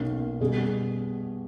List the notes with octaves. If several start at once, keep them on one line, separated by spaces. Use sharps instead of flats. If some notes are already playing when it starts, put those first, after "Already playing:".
Already playing: B1 B2 A#3 C#4
B2 G3 C#4 G#4